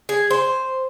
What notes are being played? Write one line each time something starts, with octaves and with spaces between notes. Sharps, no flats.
G#4
C5